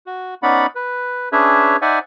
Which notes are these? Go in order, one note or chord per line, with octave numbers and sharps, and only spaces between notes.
F#4
B3 C#4 D#4 D5 F#5 B5
B4
C#4 D4 G#4 B4 C#5 E5
D#4 C5 D5 E5 F#5 G#5